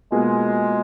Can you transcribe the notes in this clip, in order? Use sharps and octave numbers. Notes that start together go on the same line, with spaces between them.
B2 G#3 A#3 F4 G#4